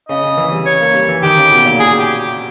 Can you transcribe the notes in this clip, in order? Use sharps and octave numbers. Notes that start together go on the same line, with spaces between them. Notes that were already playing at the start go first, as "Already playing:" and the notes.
C#3 D#5
C#3
E3
G3
C#5
A#3
G3
E3
D#3 G4
C#3
B2
A#2
G#4
G4
G4